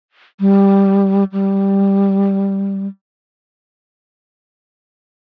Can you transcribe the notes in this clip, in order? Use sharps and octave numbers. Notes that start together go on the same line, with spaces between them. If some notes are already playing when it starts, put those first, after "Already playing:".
G3
G3